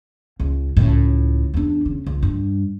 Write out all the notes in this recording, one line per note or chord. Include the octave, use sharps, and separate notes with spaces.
C#2
C#2 A2
E2 D4
C#3
C#2
G2